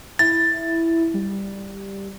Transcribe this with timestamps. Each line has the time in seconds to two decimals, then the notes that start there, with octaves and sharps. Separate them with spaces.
0.19 E4 A6
1.14 G3